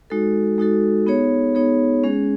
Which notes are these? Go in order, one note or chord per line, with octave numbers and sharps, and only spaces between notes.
G#3 D#4 F#4 A4
G#3 D#4 F#4 A4
B3 D#4 G#4 C#5
B3 D#4 G#4 C#5
G#3 C#4 G#4